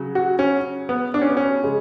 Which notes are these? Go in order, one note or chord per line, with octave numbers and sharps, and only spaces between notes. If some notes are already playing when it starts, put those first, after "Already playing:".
Already playing: C#3 F#3
F#4
C#4
B3
D4
C#4
B3
C#4
C#3 G#3